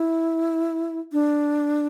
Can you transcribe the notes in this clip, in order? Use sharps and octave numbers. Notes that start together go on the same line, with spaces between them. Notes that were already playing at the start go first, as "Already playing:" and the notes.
Already playing: E4
D4